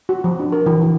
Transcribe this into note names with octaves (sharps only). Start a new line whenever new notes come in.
F#4
F3
D4
A#4
E3
E3